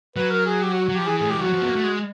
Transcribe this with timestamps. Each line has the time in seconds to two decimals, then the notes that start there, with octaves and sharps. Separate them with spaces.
0.16 F#3 B4
0.31 A#4
0.46 G#4
0.62 G4
0.73 F#4
0.85 F#3 F#4
0.95 F3 G4
1.07 E3 G#4
1.18 A3 G#4
1.29 G#3 G4
1.37 G3
1.42 F#3 F#4
1.53 F3
1.62 B3
1.69 A#3
1.76 A3
1.84 G#3